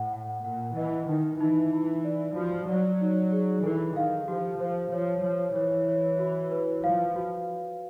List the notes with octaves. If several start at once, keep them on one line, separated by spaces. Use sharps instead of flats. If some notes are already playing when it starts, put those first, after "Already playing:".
Already playing: A2 F#5
F#5
A#2 F#5
E3 D#5
D#3 D#4
E3 D#4
E4
D5
F3 F#4
F#3 D5
D#4
G#4
E3 A4
D#3 F5
F3 G4
F3 C5
F3 C#5
F3 C#5
E3 C#5
C#5
F#4
B4
F3 F5
F#4